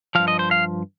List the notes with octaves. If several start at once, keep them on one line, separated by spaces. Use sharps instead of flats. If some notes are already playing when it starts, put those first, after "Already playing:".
G2 F3 F5
D#5
C5
F5